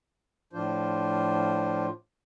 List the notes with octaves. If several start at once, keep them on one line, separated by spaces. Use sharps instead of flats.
A2 F3 D4 F4 C5